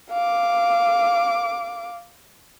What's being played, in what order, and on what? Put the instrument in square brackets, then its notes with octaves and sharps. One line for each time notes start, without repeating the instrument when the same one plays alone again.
[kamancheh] F5 D6